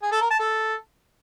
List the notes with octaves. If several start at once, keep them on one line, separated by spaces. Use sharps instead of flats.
G#4
A4
A#4
A5
A4